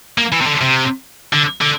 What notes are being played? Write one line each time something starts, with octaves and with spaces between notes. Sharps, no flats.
A#3
E3
C3
D3
C3
D3
D3